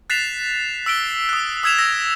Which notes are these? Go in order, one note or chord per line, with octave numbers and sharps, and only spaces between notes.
F#6 A6 B6 C7 E7 F7
E6 B6 D7 G7
D#6 F#6
D#6 E6 G#6 B6 E7 F7
E6 A#6